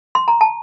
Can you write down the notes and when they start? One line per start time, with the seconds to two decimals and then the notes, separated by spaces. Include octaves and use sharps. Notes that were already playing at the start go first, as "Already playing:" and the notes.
0.15 C6
0.28 A#5
0.41 A5